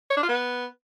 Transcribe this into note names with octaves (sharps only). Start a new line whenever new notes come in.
C#5
D4
F4
B3